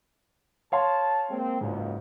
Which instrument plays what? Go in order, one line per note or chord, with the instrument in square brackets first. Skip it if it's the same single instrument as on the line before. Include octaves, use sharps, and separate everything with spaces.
[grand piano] C#5 F5 C6 [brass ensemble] A5
[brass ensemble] G#3 A#3 C4
[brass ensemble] F#1 C#2 [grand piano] G#2